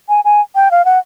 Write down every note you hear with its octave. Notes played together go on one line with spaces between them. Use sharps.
G#5
G#5
G5
F5
F#5